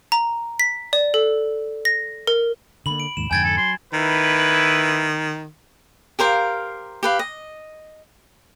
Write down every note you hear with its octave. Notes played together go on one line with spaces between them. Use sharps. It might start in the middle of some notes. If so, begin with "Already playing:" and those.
A#5
B6
D5
A4
A#6
A#4
D3 A#3 B5 F#7
D7
D#2 G#2 E7
F2 G#2 D3 G5 G#5 G#6 A6
A4
F#3 C6
D#3 E4 B4
G4 A#4 C5 F5
G4 B4 F5
D#5